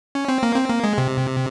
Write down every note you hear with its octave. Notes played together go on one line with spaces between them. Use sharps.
C#4
C4
A#3
C4
A#3
G#3
C3